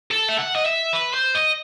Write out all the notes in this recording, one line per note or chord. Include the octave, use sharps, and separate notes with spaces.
A4
E5
F#5
D#5
E5
B4
C5
D#5